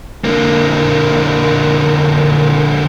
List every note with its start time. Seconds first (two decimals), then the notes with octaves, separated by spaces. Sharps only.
0.24 D3 A#3